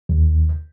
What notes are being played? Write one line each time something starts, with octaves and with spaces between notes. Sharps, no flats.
D#2